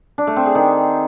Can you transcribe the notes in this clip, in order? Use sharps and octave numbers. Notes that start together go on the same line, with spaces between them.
D4
A3
C4
G#4
D#3